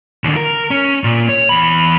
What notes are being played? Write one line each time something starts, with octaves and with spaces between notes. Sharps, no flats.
D#2 D3
A#4
C#4
A#2
C#5
E2 B5